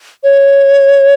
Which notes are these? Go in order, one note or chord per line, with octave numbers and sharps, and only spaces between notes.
C#5